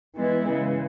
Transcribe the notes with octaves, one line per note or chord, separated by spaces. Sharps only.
E3 G#3 B3 E4
C#3 E3 G#3